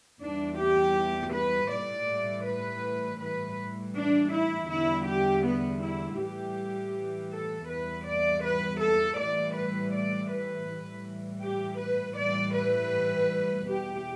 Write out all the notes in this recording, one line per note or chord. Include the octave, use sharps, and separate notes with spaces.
E2 E3 G3 D4
G4
B4
A2 E3 G3 D5
B4
A2 E3 G3 B4
D4
E4
E2 D3 G3 E4
G4
B3
E4
A2 E3 G3 G4
A4
E2 E3 G3 B4
D5
B4
A4
A2 E3 G3 D5
B4
D5
B4
A2 E3 G3
G4
B4
A2 E3 G3 D5
B4
E2 B2 G3 G4